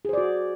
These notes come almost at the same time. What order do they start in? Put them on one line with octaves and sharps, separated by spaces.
G#4 C5 D5 F#4